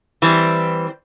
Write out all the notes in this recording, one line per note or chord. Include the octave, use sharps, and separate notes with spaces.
E3 G3 C4